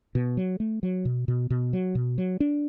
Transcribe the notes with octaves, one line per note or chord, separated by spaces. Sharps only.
B2
F#3
A3
F#3
B2
B2
B2
F#3
B2
F#3
D4